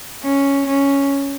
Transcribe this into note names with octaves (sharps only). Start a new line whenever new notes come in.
C#4
C#4